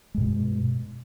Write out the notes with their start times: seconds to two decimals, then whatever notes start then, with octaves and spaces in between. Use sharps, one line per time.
0.14 G#3
0.17 G2
0.21 B2